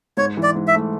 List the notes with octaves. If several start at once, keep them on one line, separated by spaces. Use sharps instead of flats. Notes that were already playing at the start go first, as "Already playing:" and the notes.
G#2 C#5
E3
D5
G#2
E5
A3